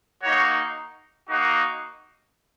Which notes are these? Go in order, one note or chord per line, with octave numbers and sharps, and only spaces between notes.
A#3 D#4 F#4 C#5
A#3 D#4 F#4